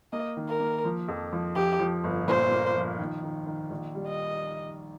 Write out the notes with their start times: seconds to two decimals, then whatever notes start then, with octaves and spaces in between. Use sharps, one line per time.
0.13 A#3 D#5
0.37 D#3
0.49 A#4
0.60 A#3
0.85 F3
1.08 F2
1.33 F3
1.55 F2 G4
1.80 F3
2.04 G1
2.28 A#2 C5
2.51 A#3
2.75 F3
2.99 D#3
3.23 D#3
3.47 D#3
3.71 A#1
3.95 G3
4.07 D#5